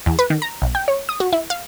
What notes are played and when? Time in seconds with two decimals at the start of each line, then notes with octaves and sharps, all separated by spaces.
0.06 E2
0.19 B4
0.30 D#3
0.42 A#5
0.62 B1
0.75 G5
0.88 C#5
1.09 D#6
1.20 F#4
1.33 E4
1.50 F5